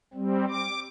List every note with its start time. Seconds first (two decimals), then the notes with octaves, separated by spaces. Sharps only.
0.14 G3 C4
0.49 D6